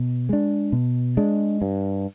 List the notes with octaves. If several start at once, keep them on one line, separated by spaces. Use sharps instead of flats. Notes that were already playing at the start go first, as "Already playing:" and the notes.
Already playing: B2
G#3 D4
B2
G#3 D4
G2